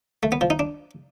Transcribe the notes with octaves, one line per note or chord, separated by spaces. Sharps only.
A3
B3
F3
D#4
D4